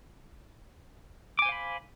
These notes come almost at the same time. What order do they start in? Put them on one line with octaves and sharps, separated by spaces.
D6 G#5 C5 F5 B5